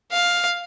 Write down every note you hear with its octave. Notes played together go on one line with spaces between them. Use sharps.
F5